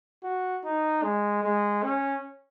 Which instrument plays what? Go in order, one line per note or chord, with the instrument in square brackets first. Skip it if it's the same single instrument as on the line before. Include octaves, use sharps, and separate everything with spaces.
[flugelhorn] F#4
D#4
G#3
G#3
C#4